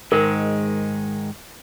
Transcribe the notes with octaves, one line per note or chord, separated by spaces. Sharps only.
G#2 D#3 G#3 A#4